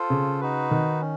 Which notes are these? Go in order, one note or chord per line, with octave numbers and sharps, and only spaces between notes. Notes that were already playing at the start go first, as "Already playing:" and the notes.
Already playing: F4 A4 C5
C#3
D#4 F#4 B4
D#3
C#4